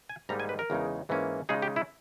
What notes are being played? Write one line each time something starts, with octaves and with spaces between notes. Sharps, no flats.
G#5
G#2 G3 A#3 D#4 A#5
G#5
B4
A#4
E2 C#3 G#3 D#4
G#2 E3 A#3 C#4
C#3 G#3 D#4 G#4
G4
E4